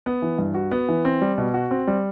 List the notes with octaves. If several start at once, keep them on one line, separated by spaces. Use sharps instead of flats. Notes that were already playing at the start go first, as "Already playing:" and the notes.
B3
E3
G2
F#4
B3
E3
C4
G3
B2
F#4
C4
G3